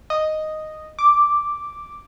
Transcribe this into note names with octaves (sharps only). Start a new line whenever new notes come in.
D#5
D6